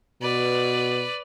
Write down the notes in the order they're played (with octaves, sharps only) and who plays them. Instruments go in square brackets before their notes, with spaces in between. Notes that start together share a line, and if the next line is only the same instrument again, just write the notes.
[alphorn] B2 [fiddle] B4 D5